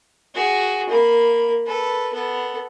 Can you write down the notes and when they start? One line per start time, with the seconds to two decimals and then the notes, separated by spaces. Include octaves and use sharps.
0.34 F#4 G#4
0.89 A#3 B5
1.66 A4 B4
2.13 B3 A4